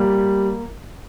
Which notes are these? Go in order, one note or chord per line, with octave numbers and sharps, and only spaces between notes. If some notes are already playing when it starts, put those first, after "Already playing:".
Already playing: G3 A#3